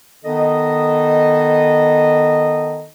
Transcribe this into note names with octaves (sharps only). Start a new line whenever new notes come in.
D#3 B3 D#4 A4 D#5